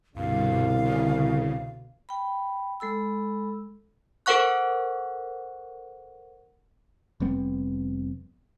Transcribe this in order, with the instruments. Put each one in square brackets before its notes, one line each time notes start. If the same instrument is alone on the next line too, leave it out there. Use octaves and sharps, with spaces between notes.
[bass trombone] C2 [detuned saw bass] G2 [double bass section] B2 D3 [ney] F5
[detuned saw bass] C#3
[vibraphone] G5 B5
G#3 A4 B5 E6
[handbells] A4 A#4 C5 F#5 C#6 F#6
[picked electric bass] F1 G3 B3 C4